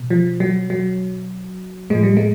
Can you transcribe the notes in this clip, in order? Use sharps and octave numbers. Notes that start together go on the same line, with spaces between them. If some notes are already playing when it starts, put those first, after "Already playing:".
Already playing: B2
F3
F#3
F#3
A2 F3 G#3
G3
G#3